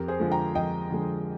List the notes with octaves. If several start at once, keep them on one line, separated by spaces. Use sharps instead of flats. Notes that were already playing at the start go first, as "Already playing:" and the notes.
Already playing: F2 G4 A#4
G#4 C5
D3 F3 G#3
G5 A#5
F2 D#5 G5
D3 F3 G#3